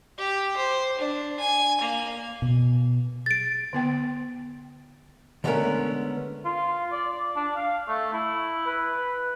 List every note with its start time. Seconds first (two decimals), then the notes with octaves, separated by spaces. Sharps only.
0.18 G4
0.56 C5
0.99 D4
1.40 G#5
1.81 A#3
2.42 B2
3.26 A6 D7
3.73 D3 B3 G5
5.44 D3 G#3 A3 B3 C#4 A#4
6.45 F4
6.92 D5
7.12 D5
7.36 D4
7.56 F5
7.88 A3
8.14 E4
8.67 B4